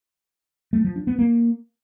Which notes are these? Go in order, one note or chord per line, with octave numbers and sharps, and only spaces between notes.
A3
F3
D4
B3
A#3